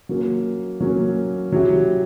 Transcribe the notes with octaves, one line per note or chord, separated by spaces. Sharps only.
F#3 A#3 C#4
F#3 A#3 C#4
F#3 C#4 E4 G4